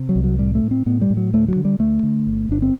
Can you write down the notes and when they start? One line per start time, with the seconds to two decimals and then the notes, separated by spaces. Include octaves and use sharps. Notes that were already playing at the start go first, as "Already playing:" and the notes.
Already playing: C3
0.09 F#3
0.16 C2
0.24 F#3
0.39 A2 G3
0.55 A3
0.62 A2
0.71 C4
0.86 A2 B3
1.01 G3
1.10 A2
1.17 F#3
1.33 D2 A3
1.48 F#3
1.56 D3
1.65 G3
1.79 D2 A3
2.03 D3
2.27 G1
2.49 G1 D4
2.62 C4